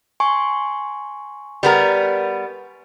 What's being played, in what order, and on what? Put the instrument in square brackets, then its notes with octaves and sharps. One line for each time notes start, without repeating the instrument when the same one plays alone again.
[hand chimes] G#5 C6 C#6
[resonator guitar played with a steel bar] G3 B3 A#4